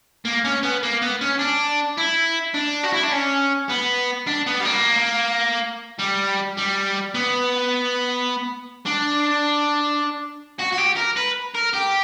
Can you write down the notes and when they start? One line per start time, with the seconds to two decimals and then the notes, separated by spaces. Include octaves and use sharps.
0.25 A#3
0.44 C#4
0.63 B3
0.83 A#3
1.02 B3
1.21 C#4
1.39 D4
1.97 E4
2.54 D4
2.84 F#4
2.93 E4
3.03 D4
3.12 C#4
3.69 B3
4.27 D4
4.46 B3
4.60 G3
4.65 A#3
5.99 G3
6.57 G3
7.14 B3
8.86 D4
10.59 F#4
10.73 F#4
10.78 G4
10.97 A#4
11.17 B4
11.55 A#4
11.74 G4